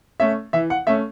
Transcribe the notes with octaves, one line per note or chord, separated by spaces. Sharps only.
A3 C#4 E5
E3 E5
F#5
A3 C#4 E5